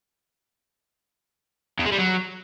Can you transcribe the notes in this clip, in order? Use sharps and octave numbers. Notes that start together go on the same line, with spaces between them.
E2
G#3
G3
F#3